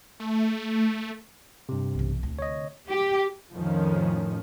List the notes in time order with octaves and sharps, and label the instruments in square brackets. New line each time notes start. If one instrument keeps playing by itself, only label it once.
[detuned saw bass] A3
[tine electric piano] G2 C3
[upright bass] B1 E3
D2 C3
[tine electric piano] C#5 D#5
[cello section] G4
[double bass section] F2 A2 D#3 F3 C#4